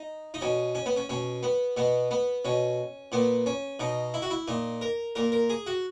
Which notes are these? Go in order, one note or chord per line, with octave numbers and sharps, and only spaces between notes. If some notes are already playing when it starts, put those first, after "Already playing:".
Already playing: D#4
D#4
B2 C#4
C#4
B3
C#4
B2 C#4
B3
B2 B3
B3
B2 C#4
A#2 B3
C#4
B2 D#4
E4
F#4
E4
A#2 D#4
A#4
A#2 A#4
A#4
G#4
F#4